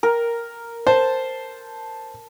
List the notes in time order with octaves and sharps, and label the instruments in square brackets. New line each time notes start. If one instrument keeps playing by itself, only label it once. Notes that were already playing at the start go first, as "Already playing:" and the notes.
[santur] A#4
[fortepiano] C5 [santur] A5